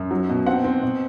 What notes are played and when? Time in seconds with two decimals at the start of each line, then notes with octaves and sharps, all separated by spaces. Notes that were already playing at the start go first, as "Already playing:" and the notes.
Already playing: F#2
0.11 F#3
0.29 B2
0.46 C4 F#5
0.64 C4
0.82 B2